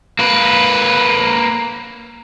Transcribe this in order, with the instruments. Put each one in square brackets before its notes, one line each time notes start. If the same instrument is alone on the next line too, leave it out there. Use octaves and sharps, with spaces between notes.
[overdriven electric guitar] A#3 B4